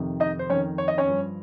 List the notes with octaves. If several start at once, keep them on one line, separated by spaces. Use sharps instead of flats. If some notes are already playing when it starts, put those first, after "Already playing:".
Already playing: F2 C3 D#3
D#4 D#5
C5
F2 D#3 C#4 C#5
C#5
D#5
C#4 C#5
G2 F3